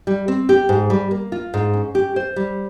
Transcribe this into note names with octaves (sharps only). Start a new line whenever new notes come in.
G3
C4
G4
G#2
G3
A#3
F4
G#2
C#4
G4
C5
G3